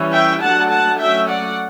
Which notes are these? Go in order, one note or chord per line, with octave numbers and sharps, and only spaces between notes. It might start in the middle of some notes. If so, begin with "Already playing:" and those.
Already playing: E3 G3 C#4
E5 G5
F#3 A3 D4 F#5 A5
F#5 A5
F#3 A3 C#4 E5 G5
D5 F#5